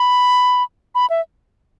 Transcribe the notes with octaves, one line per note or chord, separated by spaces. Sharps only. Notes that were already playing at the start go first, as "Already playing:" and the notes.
Already playing: B5
B5
E5